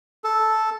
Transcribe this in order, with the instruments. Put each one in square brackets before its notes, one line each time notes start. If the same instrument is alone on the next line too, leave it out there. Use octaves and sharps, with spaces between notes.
[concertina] A4